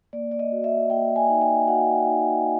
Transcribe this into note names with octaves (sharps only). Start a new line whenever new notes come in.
A#3 D5
D5
D#5
F#4
E5
A#3 G5
G#5
D#4
G5
F#4 F#5
D#4